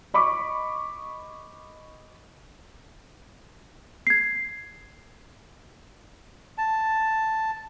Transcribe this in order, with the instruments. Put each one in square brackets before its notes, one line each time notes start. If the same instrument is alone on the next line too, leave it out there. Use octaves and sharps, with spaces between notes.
[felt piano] D#5 B5 C#6 D6
[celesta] G#6 C7
[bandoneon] A5